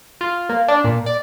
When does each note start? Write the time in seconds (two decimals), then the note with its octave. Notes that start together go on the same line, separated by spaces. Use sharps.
0.21 F4
0.49 A#3
0.68 D4
0.84 A#2
1.06 D5